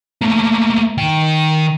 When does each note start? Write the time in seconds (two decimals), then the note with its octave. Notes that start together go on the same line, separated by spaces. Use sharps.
0.21 A3 A#3
0.98 D#3 G5